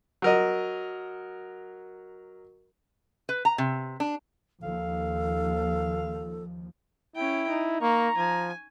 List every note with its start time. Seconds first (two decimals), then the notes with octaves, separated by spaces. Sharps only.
0.22 F#3 A#4 D#5
3.29 B4
3.45 A#5
3.58 C3
4.00 D4
4.63 D#2 F3 A4 F5
7.16 C#4 E4 G5
7.49 D#4
7.81 A#3 A#5 C#6
8.17 F3 G#5